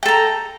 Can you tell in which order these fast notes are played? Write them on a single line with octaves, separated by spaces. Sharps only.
G5 A4 A#5